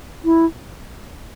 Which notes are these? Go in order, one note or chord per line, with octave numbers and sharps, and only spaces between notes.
E4